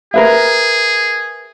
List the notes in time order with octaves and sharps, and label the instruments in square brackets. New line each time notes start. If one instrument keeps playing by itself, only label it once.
[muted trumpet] G#4 [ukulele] A#4 B4 E5